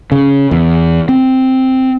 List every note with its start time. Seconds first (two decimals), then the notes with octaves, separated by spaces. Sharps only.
0.12 C#3
0.51 E2
1.09 C4